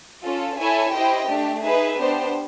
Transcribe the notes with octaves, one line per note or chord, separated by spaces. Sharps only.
C#4 F4 A4
E4 A4 C#5 E5 G#5
E4 G4 C5 D#5 G5
A3 D4 G4
D#4 G#4 B4 E5
B3 D4 G4 C5